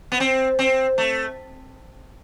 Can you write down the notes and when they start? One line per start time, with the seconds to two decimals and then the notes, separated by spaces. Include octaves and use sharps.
0.12 B3
0.20 C4
0.59 C4
0.98 A3